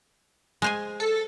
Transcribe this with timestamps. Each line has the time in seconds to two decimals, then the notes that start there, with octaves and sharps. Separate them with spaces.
0.62 G#3 C5 G#5
1.00 A4